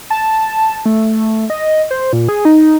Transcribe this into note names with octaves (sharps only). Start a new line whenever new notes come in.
A5
A3
D#5
C5
A#2
G#4
D#4